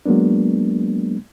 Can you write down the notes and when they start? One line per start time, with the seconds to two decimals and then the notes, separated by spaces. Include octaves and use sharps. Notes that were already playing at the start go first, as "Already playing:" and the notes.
0.06 F#3 G#3 A#3 B3 D4